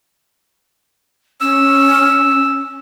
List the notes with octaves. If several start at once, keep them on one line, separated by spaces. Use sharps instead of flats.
C#4 E6